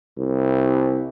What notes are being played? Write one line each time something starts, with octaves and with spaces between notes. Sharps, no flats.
C2